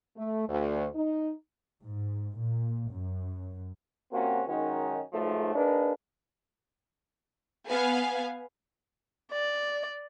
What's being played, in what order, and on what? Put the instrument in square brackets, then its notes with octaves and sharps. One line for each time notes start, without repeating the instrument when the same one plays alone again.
[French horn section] A3
D2
D#4
[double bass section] G#2
A#2
F#2
[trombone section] C3 A#3 C4 C#4 F#4
F#2 D#3 G#3 C#4 D#4 F#4
B1 G#2 F3 A3
A#3 D4 D#4 G#4 B4
[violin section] B3 F5 G#5
[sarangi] D5